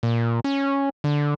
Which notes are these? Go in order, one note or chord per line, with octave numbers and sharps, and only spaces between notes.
A#2
C#4
D3